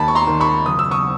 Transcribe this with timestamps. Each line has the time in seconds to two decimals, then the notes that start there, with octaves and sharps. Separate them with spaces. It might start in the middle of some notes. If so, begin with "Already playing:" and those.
Already playing: D#2 A5 B5
0.08 C#6
0.15 A#5 C6
0.27 D#3
0.40 B5 C#6
0.65 F#1 D#6
0.79 E6
0.91 C#6 D#6